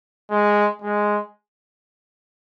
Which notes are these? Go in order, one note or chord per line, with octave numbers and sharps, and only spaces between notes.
G#3
G#3